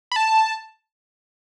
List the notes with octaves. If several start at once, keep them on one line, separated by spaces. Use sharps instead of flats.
B5
A5